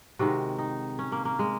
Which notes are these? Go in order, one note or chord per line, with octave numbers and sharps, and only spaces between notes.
C3 D#3 G#3 F#4
D#4
C#4
A#3
A#3
G#3